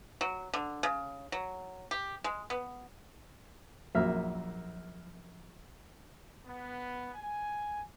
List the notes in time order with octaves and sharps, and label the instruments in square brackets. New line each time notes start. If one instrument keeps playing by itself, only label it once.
[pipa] F#3
D3
C#3
F#3
G4
G#3
B3
[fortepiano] A#1 F#2 A#3 E5 F6
[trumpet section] B3
G#5